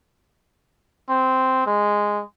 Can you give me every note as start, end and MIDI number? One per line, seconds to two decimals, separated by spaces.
1.09 1.66 60
1.66 2.21 56